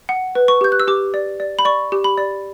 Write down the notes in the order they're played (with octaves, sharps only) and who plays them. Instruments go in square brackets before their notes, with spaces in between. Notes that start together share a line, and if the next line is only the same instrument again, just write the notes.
[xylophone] F#5
B4
C#6
G4 G6
F#6
E6
G4 D6
D5
D5
B5
D5 C#6
G4
B5
D5